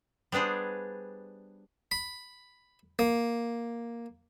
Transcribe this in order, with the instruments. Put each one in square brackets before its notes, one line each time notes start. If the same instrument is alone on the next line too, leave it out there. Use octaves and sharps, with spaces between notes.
[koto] G3 B3 D4 G#4 C5
[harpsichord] B5
A#3